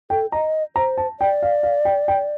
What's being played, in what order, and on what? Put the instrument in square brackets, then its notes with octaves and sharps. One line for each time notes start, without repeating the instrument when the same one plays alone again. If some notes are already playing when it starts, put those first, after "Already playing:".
[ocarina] A4 [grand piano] G5
[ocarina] D#5 [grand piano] A#5
[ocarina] C5 [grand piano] A#5
[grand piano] A5
[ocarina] D5 [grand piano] G5
[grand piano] F5
F5
G5
G5